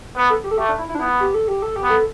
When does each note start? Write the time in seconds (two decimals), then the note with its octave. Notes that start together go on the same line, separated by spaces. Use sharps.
0.16 B3 B4
0.30 A4
0.44 G4
0.51 A4
0.58 A3 G4
0.68 D4
0.78 E4
0.89 E4
0.95 D4
1.00 B3 E4
1.20 G4
1.34 A4
1.48 G4
1.62 A4
1.76 G4
1.83 B3
1.90 A4